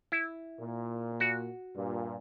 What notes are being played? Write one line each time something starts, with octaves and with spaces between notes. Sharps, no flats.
E4
A#2
F#4
G2 A#2